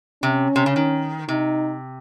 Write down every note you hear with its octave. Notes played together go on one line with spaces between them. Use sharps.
C3 C#4
C3
C#3
D#3
C3 D#4